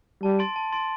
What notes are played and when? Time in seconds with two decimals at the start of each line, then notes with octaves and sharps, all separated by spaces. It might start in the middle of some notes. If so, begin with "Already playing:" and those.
0.23 G3 A5
0.39 C6 A6 D7
0.56 A5
0.72 C6 A6 D7